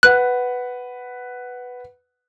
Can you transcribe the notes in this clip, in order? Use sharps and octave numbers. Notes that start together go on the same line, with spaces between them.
B4 F#5 F#6